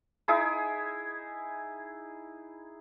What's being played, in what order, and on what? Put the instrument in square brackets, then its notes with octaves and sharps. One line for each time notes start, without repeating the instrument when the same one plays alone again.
[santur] D#4 E4 G#4